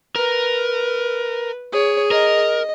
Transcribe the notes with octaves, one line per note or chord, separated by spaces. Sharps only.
A#4 B4
G#4 C#5
A#4 D#5